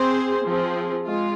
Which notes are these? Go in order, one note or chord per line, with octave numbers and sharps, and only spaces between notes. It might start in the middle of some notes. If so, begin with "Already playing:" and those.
Already playing: C4 G#4 C5
F3 C4 G#4
G#3 F4